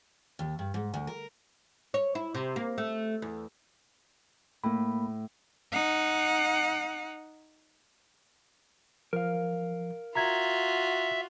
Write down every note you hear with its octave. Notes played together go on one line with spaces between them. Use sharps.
D#2
G2
G#2
D2
A#4
C#5
E4
C3
A#3
A3
E2
A2 A#3 B5
D#4 F#5
F3 A#4 F5
F4 F#4 E5 A#5 G#6